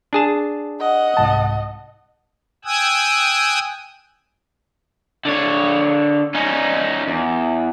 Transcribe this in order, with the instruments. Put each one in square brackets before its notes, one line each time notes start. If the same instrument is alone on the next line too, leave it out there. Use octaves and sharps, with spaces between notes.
[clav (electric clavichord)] D4 G#4 A5
[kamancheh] D#5 F#5
[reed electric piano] C2 G#2 A5
[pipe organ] G5 G#5 D#6 E6 F#6 G#6
[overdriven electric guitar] D3 C#5
C#4 D#4
E2